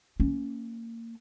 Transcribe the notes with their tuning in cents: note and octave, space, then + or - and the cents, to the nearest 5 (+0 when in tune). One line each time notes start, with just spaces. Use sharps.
A#3 -25 C#4 +0